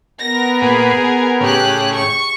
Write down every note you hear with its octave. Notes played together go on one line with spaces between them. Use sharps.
B3 A#4 A#6
A#2 G#4 B4
G#5
A2 C#3 G4 G#4 F#6
C#6